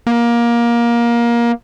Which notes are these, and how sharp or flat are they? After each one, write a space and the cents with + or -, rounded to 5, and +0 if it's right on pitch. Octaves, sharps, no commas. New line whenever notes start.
A#3 +20